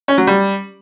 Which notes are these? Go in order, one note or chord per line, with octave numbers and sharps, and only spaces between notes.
C#4
F#3
G3